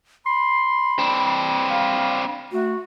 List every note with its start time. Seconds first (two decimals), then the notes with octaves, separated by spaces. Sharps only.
0.26 B5 C6
0.99 C4 D4
1.70 F5
2.52 A3 F#4